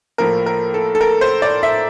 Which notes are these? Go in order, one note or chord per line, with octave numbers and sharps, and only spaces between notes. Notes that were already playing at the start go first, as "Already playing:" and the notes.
A2 F3 A#3 A#4
A#4
A4
A4
A#4
C5
D5
E5